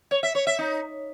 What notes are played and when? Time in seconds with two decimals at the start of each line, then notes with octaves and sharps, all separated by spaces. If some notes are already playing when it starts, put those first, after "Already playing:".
0.11 C#5
0.23 E5
0.35 C#5
0.47 E5
0.59 D#4